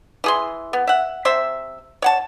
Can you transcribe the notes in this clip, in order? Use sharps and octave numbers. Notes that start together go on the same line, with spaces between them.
E3 G#4 C6
B3
E5 F#5
C3 C5 E5
C#5 F#5 A5